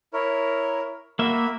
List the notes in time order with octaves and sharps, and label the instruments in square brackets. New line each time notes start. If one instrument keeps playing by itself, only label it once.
[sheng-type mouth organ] E4 A#4 C#5
[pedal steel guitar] A#3 E5 [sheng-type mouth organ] F#4 A#4 B5